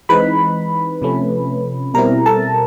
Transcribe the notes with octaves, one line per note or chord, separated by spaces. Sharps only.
E3 G#3 C4 D#4 B4 B5
C3 F3 A3 C#4
B2 G3 C4 E4 A#4 A#5
A4 A5